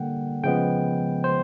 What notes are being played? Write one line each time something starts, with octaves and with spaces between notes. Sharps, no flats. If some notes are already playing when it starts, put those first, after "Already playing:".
Already playing: D3 G3 A#3 F#5 G5
C#3 F3 G#3 B3 G5
C5